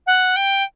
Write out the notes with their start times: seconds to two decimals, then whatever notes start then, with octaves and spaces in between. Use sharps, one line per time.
0.06 F#5
0.36 G5